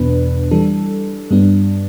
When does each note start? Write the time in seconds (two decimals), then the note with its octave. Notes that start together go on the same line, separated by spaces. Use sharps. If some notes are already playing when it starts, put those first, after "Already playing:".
Already playing: E2 B2 B3 D4 B4
0.51 E3 G3 D4 A4
1.30 G2 G3 B3 D4